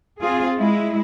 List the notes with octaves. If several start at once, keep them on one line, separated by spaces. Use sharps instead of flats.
C4 F4 G#4
G#3 E4